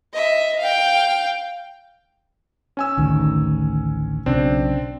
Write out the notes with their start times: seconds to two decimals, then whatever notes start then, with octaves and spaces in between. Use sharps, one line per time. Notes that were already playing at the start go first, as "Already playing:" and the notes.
0.13 D#5 E5
0.59 F5 G5
2.77 C#4 G#5 E6
2.97 A1 D2 D#3
4.26 B1 C#3 C4 D4